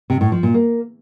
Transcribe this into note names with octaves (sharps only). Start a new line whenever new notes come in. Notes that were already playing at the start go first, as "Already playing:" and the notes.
C3
A2
F3
A#2
A#3